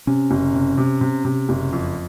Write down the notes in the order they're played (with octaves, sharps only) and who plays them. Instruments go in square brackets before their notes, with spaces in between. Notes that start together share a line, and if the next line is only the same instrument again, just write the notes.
[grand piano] C3 [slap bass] C#4
[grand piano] F#1
C3
C3
C3
C3
F#1
F2